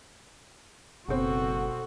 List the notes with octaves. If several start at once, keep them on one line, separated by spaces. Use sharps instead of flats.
F#1 B2 B3 C4 F#4 A4